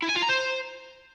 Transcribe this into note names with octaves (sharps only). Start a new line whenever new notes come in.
E4
G#5
F4
A#5
C5